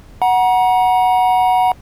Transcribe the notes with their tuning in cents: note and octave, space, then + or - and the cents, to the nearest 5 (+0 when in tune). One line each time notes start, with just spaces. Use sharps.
F#5 +0 A#5 +35